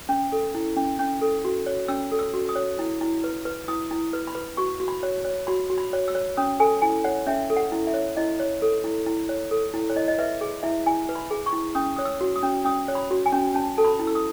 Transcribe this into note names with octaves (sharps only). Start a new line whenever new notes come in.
C#4
A4
E4
C#4
C#4
A4
F#4
C#5
C#4 E6
A4
E6
F#4
D#6
C#5
E4
E4
B4
B4
E4 D#6
E4
B4
B5
B4
F#4 C#6
F#4
B5
C#5
C#5
F#4 B5
F#4
B5
C#5
E6
C#5
C#4 D#6
A4 G#5
E4 G#5
C#5 F#5
C#4 E5
A4
F#5
E4
E5
C#5
E4 D#5
C#5
A4
E4
E4
C#5
A4
E4
C#5
E4 D#5
D#5
B4 E5
G#4
E4 E5
E4 G#5
B4
B5
G#4
C#6
E4
C#4 D#6
C#5 D#6
E6
F#4
D#6
C#4
C#4 D#6
C#5
B5
F#4
G#5
C#4
C#4 A5
A4 A5
B5
E4
E6
D#6